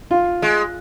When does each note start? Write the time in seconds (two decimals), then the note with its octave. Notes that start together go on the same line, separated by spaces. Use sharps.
0.11 F4
0.42 G#3